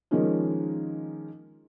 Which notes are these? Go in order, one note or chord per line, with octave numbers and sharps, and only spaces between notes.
D#3 F3 G#3 A#3 C#4 D#4